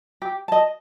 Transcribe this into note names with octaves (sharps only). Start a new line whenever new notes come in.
G4
D#5 A5